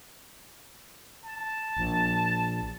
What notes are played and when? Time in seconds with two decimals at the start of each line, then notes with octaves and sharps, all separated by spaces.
1.24 A5
1.77 A#1